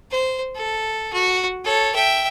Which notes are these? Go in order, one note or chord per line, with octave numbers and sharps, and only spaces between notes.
C5
A4
F#4
A4 C#5
E5 G5